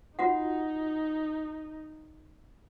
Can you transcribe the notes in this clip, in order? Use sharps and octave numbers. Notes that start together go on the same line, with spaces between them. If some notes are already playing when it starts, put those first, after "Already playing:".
D#4 F4 F#4 F#5